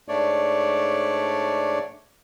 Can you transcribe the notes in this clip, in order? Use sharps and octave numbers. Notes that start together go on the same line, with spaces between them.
G#2 A3 D4 C#5 D5